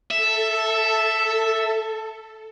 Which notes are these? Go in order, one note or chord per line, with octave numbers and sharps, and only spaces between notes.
A4 E5